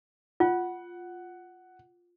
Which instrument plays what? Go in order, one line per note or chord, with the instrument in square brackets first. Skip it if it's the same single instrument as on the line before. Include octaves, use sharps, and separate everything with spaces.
[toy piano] F4 [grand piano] F#5